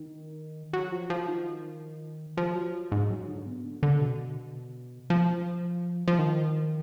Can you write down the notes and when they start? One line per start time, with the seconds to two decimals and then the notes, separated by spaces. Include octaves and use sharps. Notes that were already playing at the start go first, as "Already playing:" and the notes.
Already playing: D#3
0.73 F#3
0.92 F3
1.10 F3
1.28 D#3
2.37 F3
2.55 F#3
2.74 F3
2.92 G#2
3.10 F#3
3.28 D3
3.46 B2
3.65 D3
3.83 D3
4.01 B2
5.10 F3
6.08 F3
6.19 D#3